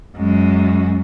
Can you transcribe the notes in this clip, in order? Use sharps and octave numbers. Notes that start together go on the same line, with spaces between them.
F#2 G#3